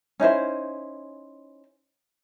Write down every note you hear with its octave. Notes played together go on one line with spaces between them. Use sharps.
C#4 D#4 E4 C5